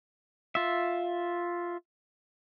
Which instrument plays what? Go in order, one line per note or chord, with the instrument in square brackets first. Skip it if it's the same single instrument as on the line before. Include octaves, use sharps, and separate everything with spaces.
[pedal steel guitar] F4 E5